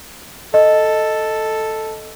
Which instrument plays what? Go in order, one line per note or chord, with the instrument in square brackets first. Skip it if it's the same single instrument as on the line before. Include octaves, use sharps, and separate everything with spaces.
[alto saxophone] A4 [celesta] D#5